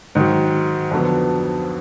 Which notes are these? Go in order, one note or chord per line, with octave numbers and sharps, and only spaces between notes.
G#2 D#3 F#3
F2 D3 F#3 B3